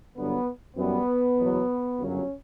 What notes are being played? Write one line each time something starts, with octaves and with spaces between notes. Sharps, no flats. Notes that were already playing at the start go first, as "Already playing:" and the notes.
G1 G2 D3 F#3 B3
F#2 E3 G3 B3
F#1 E2 B2 F#3
G1 F#2 C#3 F#3 C#4